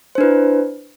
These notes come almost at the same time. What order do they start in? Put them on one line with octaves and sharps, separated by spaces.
C5 D4 B4 E4